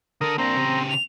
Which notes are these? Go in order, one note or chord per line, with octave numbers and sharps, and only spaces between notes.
D3 A4 A#4 D#6
A#3 C4 D4 A#5
C#3 G4
F7